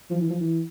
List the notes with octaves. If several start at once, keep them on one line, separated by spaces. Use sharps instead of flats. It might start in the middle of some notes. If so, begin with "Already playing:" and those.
F3
E3
F3
E3